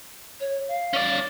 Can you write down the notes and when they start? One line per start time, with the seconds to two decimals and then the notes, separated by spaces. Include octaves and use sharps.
0.40 C#5
0.68 F5
0.93 C#4 D5